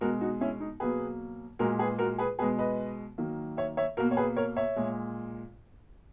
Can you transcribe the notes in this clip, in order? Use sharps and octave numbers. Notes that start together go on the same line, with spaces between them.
B2 G#3 F#4 A#4
D#4 F#4
C#4 E4
D#4
B2 F#3 A#3 G#4 B4
A#2 G#3 F#4 A#4
G#4 B4
F#4 A#4
G#4 B4
B2 G#3 G#4 B4
B4 D#5
D#3 F#3 A#3
C#5 E5
C#5 E5
B2 A#3 F#4 A#4
C#5
G#4 B4
A#4 C#5
C#5 E5
A#2 G#3